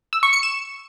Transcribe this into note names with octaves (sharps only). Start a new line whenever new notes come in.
E6
C#6
C#7
E7